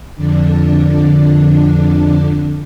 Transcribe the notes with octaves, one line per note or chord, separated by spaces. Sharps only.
F2 D3 D4